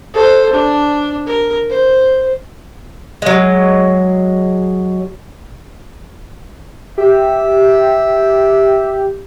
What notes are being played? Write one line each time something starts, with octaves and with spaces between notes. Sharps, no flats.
A4 C5
D4
A#4
C5
F#3 G#3
G4 E5